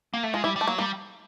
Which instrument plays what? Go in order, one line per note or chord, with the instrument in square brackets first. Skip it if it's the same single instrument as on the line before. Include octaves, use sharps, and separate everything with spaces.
[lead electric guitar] A#3
A3
[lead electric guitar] G#3 [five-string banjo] F4
[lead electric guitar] G3 [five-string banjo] E4
[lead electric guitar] G3
[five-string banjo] A3
[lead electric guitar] F#3 [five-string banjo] A#3
[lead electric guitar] G3 [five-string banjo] A#3